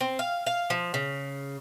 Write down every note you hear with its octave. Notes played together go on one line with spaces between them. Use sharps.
C4
F5
F5
F3
C#3